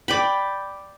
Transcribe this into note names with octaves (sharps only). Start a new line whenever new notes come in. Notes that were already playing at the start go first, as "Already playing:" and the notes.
D5 G5 B5